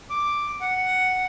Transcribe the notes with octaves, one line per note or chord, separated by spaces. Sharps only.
D6
F#5